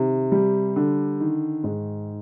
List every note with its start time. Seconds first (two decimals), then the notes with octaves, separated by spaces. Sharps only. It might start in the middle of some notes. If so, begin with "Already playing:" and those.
Already playing: C3 D#3
0.32 G3
0.76 D3
1.20 D#3
1.64 G#2